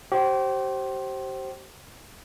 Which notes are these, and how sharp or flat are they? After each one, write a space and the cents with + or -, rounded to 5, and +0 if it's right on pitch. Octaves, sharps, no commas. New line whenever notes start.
G4 -35 C5 +20